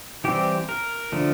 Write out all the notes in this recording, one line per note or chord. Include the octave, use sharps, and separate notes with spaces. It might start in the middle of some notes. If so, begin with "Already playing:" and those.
E3 G3 C4 G4
A#4
D3 F3 A3